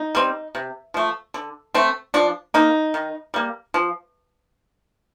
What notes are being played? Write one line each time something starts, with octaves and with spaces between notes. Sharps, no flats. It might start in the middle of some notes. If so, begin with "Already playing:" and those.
Already playing: D#4
G3 C4
C3
F3 A3
D3
A3 C4
F3 D4
A#3 D#4
D#3
G3 A#3
F3